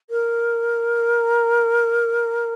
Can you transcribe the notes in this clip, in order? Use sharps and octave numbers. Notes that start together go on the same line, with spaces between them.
A#4